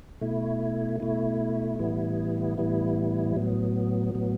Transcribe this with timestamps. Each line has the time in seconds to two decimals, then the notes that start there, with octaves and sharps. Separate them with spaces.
0.21 B2 A3 E4
1.00 B2 A3 E4
1.79 A2 E3 G3 B3 E4
2.57 A2 E3 G3 B3 E4
3.36 A2 F#3 B3
4.15 A2 F#3 B3